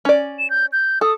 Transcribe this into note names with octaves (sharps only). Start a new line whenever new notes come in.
C#4 D5
E7
G6
G6
A4 D#6